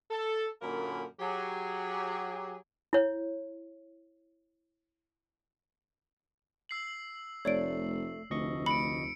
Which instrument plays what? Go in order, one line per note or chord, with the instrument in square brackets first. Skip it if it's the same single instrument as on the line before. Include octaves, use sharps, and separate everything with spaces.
[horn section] A4
F#2 A#2 D3 A#3 C#4 B5
F#3 G4 G#4
[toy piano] E4 C#5
[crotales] E6 C7 F#7
[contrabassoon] F1 [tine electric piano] A3 [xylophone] C#5 D5 D7
[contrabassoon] F1 [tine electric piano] D2 D#5 C#6
[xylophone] B5 [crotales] C#7 D7